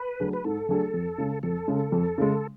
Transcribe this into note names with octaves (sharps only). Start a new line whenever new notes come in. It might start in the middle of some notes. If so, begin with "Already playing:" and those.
Already playing: B4
F#3 A3 D4 G#4
B4
G#2 A4
F#3 A3 D4 G#4
F2
C#3 G#3
F2 A4
C#3 G#3
F2
C#3 G#3